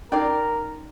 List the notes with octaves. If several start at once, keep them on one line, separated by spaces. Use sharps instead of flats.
C#4 D#4 A#4 D5 C6 D6